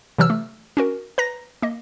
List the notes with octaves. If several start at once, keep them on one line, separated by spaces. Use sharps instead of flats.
C3 E3 F#3 E6 F6
A3
C#4 F#4 A#4
B4 A#5 A#6
A#3 D#5